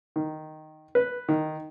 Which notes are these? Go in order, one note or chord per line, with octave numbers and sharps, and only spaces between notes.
D#3
B4
D#3